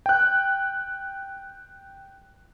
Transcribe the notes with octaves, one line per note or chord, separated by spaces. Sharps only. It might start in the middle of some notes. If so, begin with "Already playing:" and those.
G5 F#6